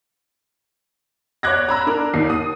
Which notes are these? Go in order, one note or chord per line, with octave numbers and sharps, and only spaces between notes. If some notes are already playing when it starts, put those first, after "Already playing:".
C#5 D5 D6 F#6 G#6 A#6
A#5 B5 E6
D4 A#4
D#2 D#4 C7
D#6